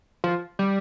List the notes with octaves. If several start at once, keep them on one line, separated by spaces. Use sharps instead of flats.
F3
G3